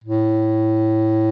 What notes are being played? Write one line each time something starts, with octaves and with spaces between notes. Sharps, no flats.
A2